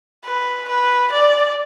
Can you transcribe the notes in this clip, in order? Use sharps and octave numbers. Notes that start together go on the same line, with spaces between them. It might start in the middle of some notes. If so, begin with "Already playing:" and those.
B4
B4
D5